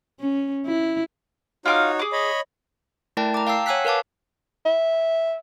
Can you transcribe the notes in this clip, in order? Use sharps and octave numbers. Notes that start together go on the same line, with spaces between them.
C#4
E4
D#4 F4 F#4 C#5 D6 F6
G#4 D6
C#5 D#5 B5
A3 E4 A#4 D5 G5 A5
A#5 D6
F5 G5 A5 E6 C7
C#5 F#5 G#5 E6 F#6 B6
A#4 B4 F5 A5 D6
E5